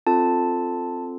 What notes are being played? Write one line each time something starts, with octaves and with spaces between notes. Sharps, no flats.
C4 F4 A4 A5